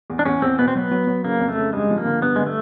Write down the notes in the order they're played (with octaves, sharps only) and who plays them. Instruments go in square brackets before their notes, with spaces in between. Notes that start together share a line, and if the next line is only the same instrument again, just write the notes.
[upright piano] E2
[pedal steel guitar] D4
[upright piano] E2 [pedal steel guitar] C#4
[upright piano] E2 [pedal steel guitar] C4
[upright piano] B2 [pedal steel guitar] B3
[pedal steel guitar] C4
[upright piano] F#3 [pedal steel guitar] B3
[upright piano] F#3
F#3
[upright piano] C#3 [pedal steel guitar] A#3
[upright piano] F2
[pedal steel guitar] A3
[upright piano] C#3
[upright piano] G2 [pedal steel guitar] G#3
[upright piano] F3
[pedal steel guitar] A#3
[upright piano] D3
[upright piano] G2 [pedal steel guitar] B3
[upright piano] D3 [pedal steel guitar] G#3
[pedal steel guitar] A3